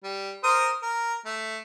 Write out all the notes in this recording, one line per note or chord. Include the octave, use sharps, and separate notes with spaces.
G3
A#4 C5 D#6
A#4
A3